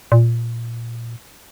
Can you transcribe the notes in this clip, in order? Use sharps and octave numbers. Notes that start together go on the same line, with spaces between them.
A#2